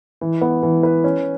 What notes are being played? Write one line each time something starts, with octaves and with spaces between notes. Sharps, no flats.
E3
B3
E3
B4
C#4